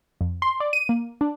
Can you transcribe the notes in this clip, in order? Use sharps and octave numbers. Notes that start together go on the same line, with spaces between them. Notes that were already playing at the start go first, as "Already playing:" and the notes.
F2
C6
D5
D#7
A#3
D4